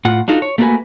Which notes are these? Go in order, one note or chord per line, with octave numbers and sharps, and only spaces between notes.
A2 F4 F#5
D4 D#4 F4 F#4 A4
C#5
A3 A#3 D4 F#4 B4 G#5